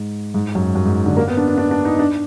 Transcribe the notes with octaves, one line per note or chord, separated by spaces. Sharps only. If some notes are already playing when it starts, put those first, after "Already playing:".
Already playing: G#2
G#2
F#2
F#2
G#2
D3
A#3
B3
D4
D4
D4
D4
D#4
D4